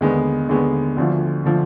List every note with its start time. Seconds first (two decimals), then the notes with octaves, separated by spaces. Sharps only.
0.01 D#2 D3 G#3 B3
0.49 D#2 D3 G#3 B3
0.97 D2 D3 F3
1.46 D3 F3